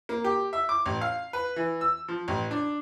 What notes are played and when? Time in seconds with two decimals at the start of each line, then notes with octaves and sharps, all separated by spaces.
0.09 A#3
0.24 G4
0.53 E5
0.69 D6
0.86 A1
1.01 F5
1.33 B4
1.56 E3
1.81 E6
2.08 F3
2.28 A1
2.51 D4